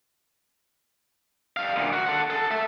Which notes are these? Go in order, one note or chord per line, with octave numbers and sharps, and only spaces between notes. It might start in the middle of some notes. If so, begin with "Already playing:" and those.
G3 F5
D2 A#2
F#4
A4 F#5
G#4 A4
E5 A5